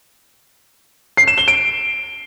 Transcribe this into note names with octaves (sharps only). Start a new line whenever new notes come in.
C7
E7
G7
D7